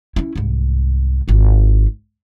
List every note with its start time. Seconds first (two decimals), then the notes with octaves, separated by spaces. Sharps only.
0.16 C#4 E4
0.36 C2 G#2
1.28 G#1 F4